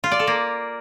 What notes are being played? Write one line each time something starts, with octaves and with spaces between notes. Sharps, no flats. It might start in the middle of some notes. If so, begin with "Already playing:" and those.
F4
D5
A4
A#3